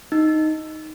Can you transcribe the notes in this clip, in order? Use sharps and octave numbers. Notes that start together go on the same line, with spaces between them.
D#4